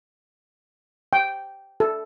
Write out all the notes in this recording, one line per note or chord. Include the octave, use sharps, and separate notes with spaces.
G5
A4